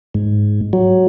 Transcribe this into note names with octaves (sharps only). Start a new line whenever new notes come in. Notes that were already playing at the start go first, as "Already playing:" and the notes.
G#2
F#3